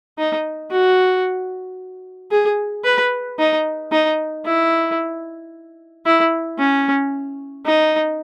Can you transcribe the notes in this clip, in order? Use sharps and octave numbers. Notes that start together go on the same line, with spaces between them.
D#4
F#4
G#4
B4
D#4
D#4
E4
E4
C#4
D#4